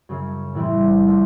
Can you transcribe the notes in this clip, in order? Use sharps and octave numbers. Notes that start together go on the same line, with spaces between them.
F#2 C#3 F#3
A2 E3 G3 C4 E4
F3 A3 C4